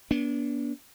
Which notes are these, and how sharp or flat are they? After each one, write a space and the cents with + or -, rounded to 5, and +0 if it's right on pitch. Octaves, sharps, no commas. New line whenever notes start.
B3 -40 D4 -30